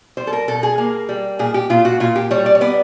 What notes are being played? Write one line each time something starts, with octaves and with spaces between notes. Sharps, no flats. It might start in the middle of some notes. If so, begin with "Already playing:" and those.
G3 C5
A4
A#4
B2 A4
G#4
A#3
G3
A#2 G#4
G4
A#2 F4
F#4
A#2 F4
G4
G3 C#5
D5
C#5
B3 D5